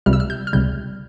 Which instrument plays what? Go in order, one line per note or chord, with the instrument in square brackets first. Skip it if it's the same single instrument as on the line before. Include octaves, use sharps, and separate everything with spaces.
[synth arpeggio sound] C#2 C3 G3 F6
E6
F6
G6
F6
C#2 C3 G3 G6